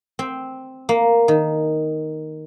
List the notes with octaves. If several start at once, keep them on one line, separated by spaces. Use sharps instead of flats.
C4
A#3
D#3